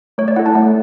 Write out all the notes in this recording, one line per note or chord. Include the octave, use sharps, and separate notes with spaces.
A3 C#5
D5
E4 A4 F#5
A5
A3 F#5